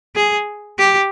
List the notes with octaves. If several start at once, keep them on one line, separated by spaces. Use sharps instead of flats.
G#4
G4